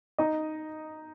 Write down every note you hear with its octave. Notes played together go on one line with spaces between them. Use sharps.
D#4 D#5